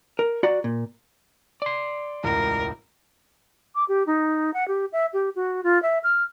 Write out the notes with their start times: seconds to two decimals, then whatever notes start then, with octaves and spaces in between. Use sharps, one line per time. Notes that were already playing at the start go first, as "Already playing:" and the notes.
0.19 A#4
0.43 F#4 D5 F#5 A#5
0.64 A#2
1.62 D5 C6
2.24 E1 C#2 A2 A#4
3.75 D6
3.88 G4
4.07 D#4
4.54 F#5
4.68 G4
4.93 E5
5.13 G4
5.36 F#4
5.64 F4
5.83 E5
6.04 F6